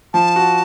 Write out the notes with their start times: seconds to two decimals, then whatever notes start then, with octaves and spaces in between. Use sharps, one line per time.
0.14 F3 A5
0.36 F#4